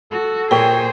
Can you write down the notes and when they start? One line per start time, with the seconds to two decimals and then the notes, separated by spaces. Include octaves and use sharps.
0.11 F#4 A4
0.51 A#2 G#4 C5 C#5 G5